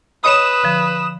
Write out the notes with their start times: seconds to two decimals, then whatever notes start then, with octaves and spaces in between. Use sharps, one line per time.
0.24 B4 C#5 D#5 B5 D#6 E7
0.63 D3 F3